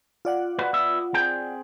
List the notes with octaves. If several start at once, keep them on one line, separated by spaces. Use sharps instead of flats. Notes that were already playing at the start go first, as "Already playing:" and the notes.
F4 D5 F#5
F#4 B4
B3 E5
C4 G#4 G5